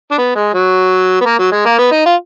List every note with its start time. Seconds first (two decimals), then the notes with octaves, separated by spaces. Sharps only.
0.11 D4
0.18 B3
0.36 G#3
0.54 F#3
1.21 B3
1.26 A#3
1.39 F#3
1.52 G#3
1.66 A#3
1.79 B3
1.92 D#4
2.06 F4